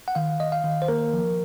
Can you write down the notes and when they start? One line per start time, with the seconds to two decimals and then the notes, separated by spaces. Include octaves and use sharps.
0.08 F#5
0.15 D#3 F5
0.40 D#3 D#5
0.52 F5
0.64 D#3
0.82 C5
0.88 A#3 A#4
1.14 F3